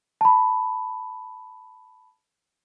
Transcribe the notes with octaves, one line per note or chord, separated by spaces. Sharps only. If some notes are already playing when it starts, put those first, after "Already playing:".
A5 B5